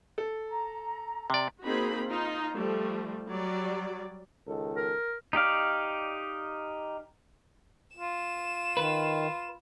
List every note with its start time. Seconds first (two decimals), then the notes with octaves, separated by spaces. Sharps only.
0.18 A4
0.49 A#5
1.30 C3 D5
1.64 A#3 C4 D#4 F#4 G#4 B5
2.06 D#4 F4
2.55 F3 G3 A3
3.32 F#3 G3 D5
4.47 C#2 D#3 A4
4.76 A#4
5.33 D#4 G4 D5 F5
7.97 F4 E7
8.77 D#3 B4